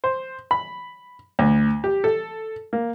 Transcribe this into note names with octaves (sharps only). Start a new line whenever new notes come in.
C5
B5
D2
G4
A4
A#3